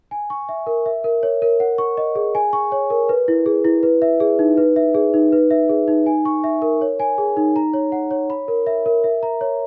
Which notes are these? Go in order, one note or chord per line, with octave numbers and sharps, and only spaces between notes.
G#5
C#6
E5
A#4
E5
A#4
C#5
A#4
F#5
C#6
D#5
G#4
G#5
C#6
C#5
A#4
B4
E4
G#4
E4
B4
E5
G#4
D#4
B4
E5
G#4
D#4
B4
E5
G#4
D#4
G#5
C#6
E5
A#4
C#5
G#5
G#4
D#4
A#5
C#5
F#5
C#5
B5
A#4
E5
A#4
E5
A#5
C#5